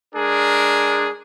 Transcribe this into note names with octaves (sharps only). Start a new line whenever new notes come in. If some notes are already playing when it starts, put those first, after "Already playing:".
G#3 D4 G#4 A#4